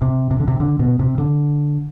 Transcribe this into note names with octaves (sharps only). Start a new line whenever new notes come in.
C3
C3
D3
C3
D3
B2
C3
D3